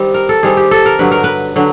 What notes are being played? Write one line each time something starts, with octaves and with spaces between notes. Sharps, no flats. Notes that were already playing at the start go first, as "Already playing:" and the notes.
Already playing: D#3 G3 C4
A#4
A4
D#3 G3 C4 G#4
G4
A4
A#4
G2 D3 F#3 B4
A#4
B4
D3 F#3